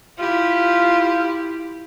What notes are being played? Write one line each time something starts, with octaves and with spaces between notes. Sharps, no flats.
E4 F4 G4